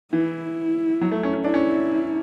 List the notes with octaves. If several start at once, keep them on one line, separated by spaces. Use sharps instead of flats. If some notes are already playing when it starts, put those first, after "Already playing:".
E3 E4
F#3
A3
C#4
C#4
D4 E4
C#4